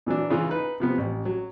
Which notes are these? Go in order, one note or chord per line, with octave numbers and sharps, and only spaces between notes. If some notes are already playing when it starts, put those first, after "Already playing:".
A#2 E3 F#3 D4
C#3 E3 F4
D#4 B4
C3 F3 B3
A1
F#3